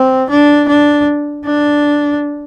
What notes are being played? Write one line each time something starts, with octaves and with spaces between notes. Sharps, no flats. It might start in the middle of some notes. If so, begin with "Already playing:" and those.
Already playing: C4
D4
D4
D4